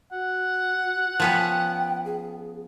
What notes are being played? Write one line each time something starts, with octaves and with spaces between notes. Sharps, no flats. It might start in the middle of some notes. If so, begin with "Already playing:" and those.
F#4 F#5
F3 B3 C#4 G5
G#4